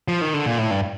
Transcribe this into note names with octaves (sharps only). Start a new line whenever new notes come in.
F3
D#3
D3
A#2
A2
G2